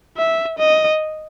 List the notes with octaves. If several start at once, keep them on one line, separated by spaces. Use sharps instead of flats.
E5
D#5